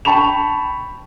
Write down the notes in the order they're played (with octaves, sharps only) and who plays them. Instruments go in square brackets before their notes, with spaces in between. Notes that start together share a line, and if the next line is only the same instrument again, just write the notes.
[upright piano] G5 A5 B5 C#6 F7